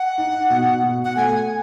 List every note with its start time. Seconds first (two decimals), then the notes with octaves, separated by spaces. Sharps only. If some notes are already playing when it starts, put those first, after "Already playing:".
Already playing: F#5
0.18 D#4
0.50 B2
0.83 B2
1.04 F#5
1.16 A3 G#5